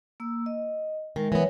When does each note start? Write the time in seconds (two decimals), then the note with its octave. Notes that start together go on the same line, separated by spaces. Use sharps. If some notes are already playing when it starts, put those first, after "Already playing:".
0.20 A#3 E6
0.46 D#5
1.16 D#3 G#3 A#4
1.32 E3 F#3 B3 C#5